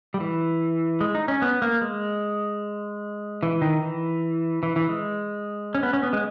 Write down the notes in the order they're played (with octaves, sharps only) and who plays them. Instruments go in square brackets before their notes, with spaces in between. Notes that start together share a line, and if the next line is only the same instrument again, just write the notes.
[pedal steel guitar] G3
E3
G#3
D#4
C#4
B3
A#3
G#3
E3
D#3
E3
E3
E3
G#3
C#4
B3
C#4
B3
G#3